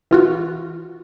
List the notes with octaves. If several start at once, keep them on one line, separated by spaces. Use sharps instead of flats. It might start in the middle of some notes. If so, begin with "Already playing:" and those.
E3 F4 F#4